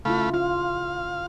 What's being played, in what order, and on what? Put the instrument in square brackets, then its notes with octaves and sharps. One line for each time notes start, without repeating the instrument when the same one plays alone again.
[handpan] C#3 E4 F4 [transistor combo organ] A3 F5 B5
[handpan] F4 [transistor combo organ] F5